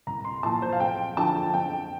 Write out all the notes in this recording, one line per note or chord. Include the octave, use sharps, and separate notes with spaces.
C2 A#5
C6
A#2 F3 A5
C5
F5
F2 G5
D3 F3 A5
F2 G5